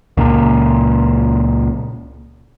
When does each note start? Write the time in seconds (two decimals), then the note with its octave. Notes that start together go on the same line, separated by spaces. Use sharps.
0.17 C#2 A#2